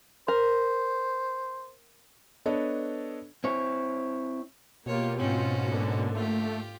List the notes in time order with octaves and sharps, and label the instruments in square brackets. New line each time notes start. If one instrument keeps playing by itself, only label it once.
[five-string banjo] A#4 [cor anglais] C5
[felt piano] B3 D4 A4 B4 C#5 D#5
[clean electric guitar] C4 E4 C#5
[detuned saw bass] B2 [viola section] A#3 F4 G4 [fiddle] C#5
[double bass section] G#2 [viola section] C4 F4 [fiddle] C#4 F#4
[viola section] D3 A#3
[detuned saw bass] A3 [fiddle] F4 G4